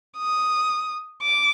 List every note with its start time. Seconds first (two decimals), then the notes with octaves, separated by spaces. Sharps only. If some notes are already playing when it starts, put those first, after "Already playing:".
0.18 D#6
1.23 D6